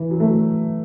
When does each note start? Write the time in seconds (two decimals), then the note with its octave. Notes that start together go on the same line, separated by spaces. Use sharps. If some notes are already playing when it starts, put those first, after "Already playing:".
Already playing: E3
0.11 F#3
0.20 A3
0.29 F#3